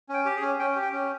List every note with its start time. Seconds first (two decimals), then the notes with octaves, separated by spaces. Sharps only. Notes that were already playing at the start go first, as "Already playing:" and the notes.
0.09 C#4 G5
0.25 G4
0.37 G#4
0.42 C#4
0.59 C#4 G5
0.76 G4
0.82 G5
0.93 C#4